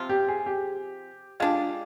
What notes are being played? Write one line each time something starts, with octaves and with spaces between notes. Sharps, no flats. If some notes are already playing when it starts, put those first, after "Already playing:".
Already playing: C3 F3 C4 F4
G4
G#4
G4
G#3 D4 F4 G4